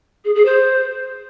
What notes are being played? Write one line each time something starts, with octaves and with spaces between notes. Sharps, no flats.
G#4
G#4
C5